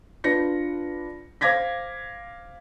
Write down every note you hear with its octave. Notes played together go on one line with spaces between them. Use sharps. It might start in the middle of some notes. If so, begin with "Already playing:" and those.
D4 F4 B4 A#6 C#7
C5 F5 D6 G#6 A#6 B6